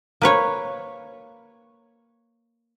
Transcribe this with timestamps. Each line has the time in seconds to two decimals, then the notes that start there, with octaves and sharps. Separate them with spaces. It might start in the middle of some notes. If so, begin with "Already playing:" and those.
0.22 A#3 B4 C#5